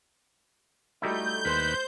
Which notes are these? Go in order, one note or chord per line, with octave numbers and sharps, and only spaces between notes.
G3 A3 D#4 E4 F#4 G6
D#2 B4 C5